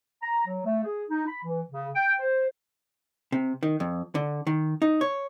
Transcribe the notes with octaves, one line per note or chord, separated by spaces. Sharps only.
A#5
F#3
A3
G#4
D#4
B5
E3
C#3
G5
C5
C3
D#3
F2
D3
D#3
D#4
C#5